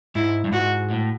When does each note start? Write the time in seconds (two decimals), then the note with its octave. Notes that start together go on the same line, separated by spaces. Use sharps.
0.15 G#2 E4
0.45 G2
0.52 G#2 F#4
0.90 A2